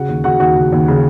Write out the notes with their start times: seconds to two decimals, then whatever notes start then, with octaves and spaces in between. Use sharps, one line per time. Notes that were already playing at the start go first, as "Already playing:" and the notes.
Already playing: C#3 F#4 F#5
0.09 D#2
0.24 C#3 F#4 F#5
0.40 D#2 F#4 F#5
0.56 C#3
0.73 D#2
0.88 C#3